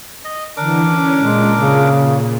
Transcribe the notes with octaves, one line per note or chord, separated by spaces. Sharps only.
D#5
D3 E3 D4 A#4 D6
C#4
A#2 G#3
C#3